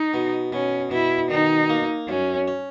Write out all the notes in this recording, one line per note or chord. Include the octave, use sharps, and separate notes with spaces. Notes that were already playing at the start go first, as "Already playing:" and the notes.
Already playing: D#4
B2
B2 C#4
B2 E4
D#3 D#4
A#3
F#2 C#4
C#4